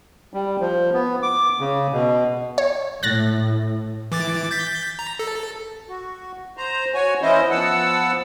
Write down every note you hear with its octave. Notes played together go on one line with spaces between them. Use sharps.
G3
F3
B3
D6
C#3
B2
C#5
A2 F#6 A6 A#6
E3 D6 A6
G6 A6 B6
A#5
A4
F#4
C5 A#5
F#4 C#5 G#5
E3 C#4 E4 C5 D#5
F3 B3 F#5 A5 E6